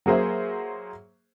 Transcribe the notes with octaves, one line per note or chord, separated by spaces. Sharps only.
F#3 A#3 G#4 C5 E5